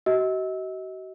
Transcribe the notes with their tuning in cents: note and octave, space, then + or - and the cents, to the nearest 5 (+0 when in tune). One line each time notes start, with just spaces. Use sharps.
F#4 +40 D#5 +35 E6 -20